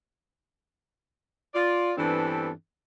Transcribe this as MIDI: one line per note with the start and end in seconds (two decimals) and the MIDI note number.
1.54 1.92 65
1.54 1.92 74
1.97 2.50 43
1.97 2.50 52
1.97 2.50 59
1.97 2.50 60
1.97 2.50 62
1.97 2.50 69